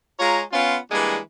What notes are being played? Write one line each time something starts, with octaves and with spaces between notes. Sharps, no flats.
G#3 F4 C#5 A#5
B3 C#4 F4
E3 G3 G#3 A#3 D4